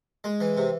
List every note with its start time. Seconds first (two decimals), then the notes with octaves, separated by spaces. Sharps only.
0.24 G#3
0.40 E3
0.57 C3